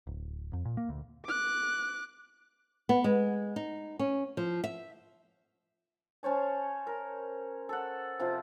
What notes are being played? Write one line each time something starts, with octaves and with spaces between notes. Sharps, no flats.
D1
F2
A#2
A#3
D2
D6 F#6
B3
G#3
D#4
C#4
F3
E5
C#4 C5 C#5 A5
A#4
A4 F#5
C3 F3 F4